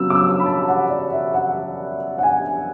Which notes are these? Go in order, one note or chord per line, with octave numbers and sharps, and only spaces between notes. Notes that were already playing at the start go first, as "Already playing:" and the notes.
Already playing: C#3 F#3 B3 E6
D6
E6
B5
A5
F#5
D5
E5
F#5
F#5
G#5